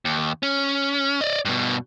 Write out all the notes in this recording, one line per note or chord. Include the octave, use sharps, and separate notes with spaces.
D#2
C#4
D5 D#5
G2 B2